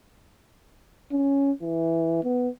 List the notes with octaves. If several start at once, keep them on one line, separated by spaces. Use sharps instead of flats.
C#4
E3
B3